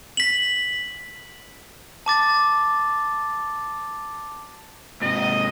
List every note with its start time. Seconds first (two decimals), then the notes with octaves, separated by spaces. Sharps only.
0.17 B6 F#7
2.06 A5 D6 A6
5.02 G#2 C3 D#5